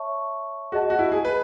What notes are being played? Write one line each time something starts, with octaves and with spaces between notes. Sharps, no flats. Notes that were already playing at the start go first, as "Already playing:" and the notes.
Already playing: C#5 E5 A5 C#6
F#4 G#4 D#5 A5
F#4
E4
G#4
B4